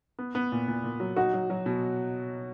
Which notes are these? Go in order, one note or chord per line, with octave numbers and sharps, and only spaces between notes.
B3
B3
A#2
A#2
A#2
F#3
D#4 F#4
F#3
F#3
B2